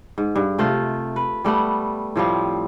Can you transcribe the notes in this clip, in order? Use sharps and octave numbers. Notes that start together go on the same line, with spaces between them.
G#2
G2
C3 A3 F4
B4
G3 A3 B3 F#5
A2 F3 G3 C4